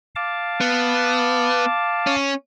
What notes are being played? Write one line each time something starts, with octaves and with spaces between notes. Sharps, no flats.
F5 A5 D6
B3
C#4